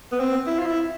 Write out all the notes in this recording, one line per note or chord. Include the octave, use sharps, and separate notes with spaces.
B3
C4
E4
F4
E4